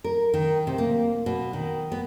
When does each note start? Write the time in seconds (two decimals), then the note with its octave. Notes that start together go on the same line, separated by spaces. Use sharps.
0.04 A#4
0.34 D#3
0.67 C3
0.78 A#3
1.26 B2
1.53 D#3
1.92 B3